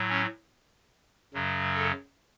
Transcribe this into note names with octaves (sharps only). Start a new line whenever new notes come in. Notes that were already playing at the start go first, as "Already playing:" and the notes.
Already playing: A2 F#3
C#4
F#2 C#3 F#3
A4